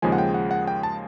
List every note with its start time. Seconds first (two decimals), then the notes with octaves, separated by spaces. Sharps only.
0.02 D#2 C#3 F3 G#3 G#5
0.12 F#5
0.18 G5
0.34 F#5
0.51 F#5
0.67 G5
0.83 A5